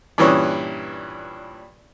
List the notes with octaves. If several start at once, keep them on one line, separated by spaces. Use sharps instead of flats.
G2 A#2 E3 C#4 C#6 D#6